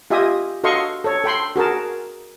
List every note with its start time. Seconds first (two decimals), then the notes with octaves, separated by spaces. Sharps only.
0.10 F4 G4 D#5 E5 G#5 D#6
0.64 F#4 A4 D#5 F5 C6 C#6
1.04 A4 C#5
1.24 A4 G5 B5 C6
1.56 F#4 G#4 A#4 A5